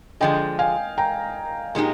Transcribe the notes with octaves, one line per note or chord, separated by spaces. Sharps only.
D3 F3 G#3 D#5 G5
F5 G#5
G5 A#5
A#2 G#3 D#4 G4